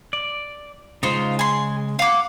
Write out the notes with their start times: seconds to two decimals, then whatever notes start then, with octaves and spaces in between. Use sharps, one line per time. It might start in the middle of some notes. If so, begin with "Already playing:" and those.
0.13 D5
1.03 C#3 G#3 D#4 F4 C5
1.39 G#4 C6
1.99 F5 F#5 D6